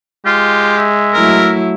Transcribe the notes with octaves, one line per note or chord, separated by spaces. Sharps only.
G#3 F4 G4
E5
F#3 A3 E4 A#4